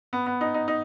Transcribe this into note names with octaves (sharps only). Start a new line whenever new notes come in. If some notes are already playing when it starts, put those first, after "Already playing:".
B3
B3
D#4
D#4
D#4